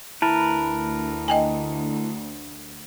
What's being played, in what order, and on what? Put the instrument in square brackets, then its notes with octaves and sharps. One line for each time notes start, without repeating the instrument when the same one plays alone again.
[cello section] D2 [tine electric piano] E4 A5 [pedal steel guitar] A#4 B4
[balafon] D#5 G5 G#5